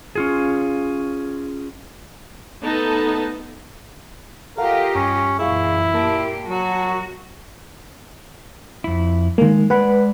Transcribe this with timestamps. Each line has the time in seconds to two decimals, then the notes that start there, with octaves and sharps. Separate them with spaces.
0.15 C#4 F4 G#4
2.64 A3 B3 D#4 A4 A5
4.58 F4 G4 A4 A#4 D#5 F5 F#5
4.95 G2 C#4
5.39 F#2 A#2 E3 E4 G#4 F5 C#6
5.94 A#2 A#3 G4 A#4 A5
6.48 F#3 F#4
8.84 F2 E4
9.38 D#3 G#3 A#3
9.70 G#3 B4 D5 F#5 B5